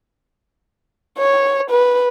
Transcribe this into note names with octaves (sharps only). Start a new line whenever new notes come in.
C#5
B4